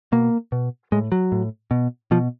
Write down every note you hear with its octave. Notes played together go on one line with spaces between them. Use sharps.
B2 A#3
B2
A2 G#3
F#3
A2
B2
B2 F3